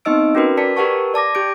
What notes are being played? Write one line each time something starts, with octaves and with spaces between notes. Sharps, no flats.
B3 C4 D#4 D#5 E6 D7
C#4 F#4 A#4 B4
D5 A5 B6 C#7
G4 A#4 B4 F#5 A5 C#6
D5 A5 D6 A#6
G4 G6 D7